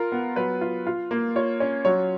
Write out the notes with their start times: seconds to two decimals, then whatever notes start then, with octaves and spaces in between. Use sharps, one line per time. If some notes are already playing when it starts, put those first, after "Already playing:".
Already playing: F4 A#4
0.12 B3
0.36 F#3 B4
0.61 F4
0.87 F4
1.11 A#3
1.36 F4 C#5
1.60 C#4
1.85 F#3 C#5